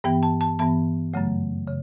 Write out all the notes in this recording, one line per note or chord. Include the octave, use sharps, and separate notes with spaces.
G2 E3 B3 G5
A5
A5
G2 E3 B3 A5
F#2 C#3 F#3 A3
C#3